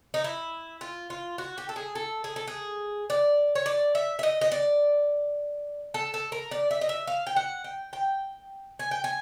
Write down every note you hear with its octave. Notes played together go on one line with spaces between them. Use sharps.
D#4
E4
F4
F4
F#4
G4
A4
G#4
A4
G#4
A4
G#4
D5
C#5
D5
E5
E5
D#5
D#5
D5
A4
A4
A#4
D5
E5
D#5
E5
F5
G5
F#5
G5
G5
G#5
G5
G#5